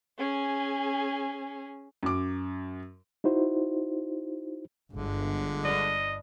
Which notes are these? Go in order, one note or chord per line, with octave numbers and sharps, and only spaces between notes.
C#4 G#4
F#2 D6
D#4 E4 F#4 C5
G1 D3 G#3
D4 B4 D#5 F5